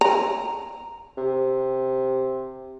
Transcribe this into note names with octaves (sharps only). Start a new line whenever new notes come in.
A#5
C3